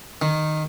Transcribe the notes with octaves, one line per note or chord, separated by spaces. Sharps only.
D#3